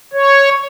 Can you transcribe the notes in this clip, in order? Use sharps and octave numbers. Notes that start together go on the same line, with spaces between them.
C#5